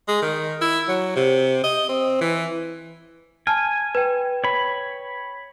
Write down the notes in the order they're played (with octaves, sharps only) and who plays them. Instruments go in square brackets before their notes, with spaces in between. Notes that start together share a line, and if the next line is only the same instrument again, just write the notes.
[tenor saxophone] G#3
D#3
E4
F#3
C3
D#5
C4
E3
[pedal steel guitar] G#5 [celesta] A5 F6
[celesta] B4 G5
[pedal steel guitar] C#5 B5